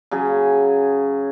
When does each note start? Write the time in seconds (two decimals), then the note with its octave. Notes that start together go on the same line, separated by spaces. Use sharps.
0.11 C#3 F#3 G#4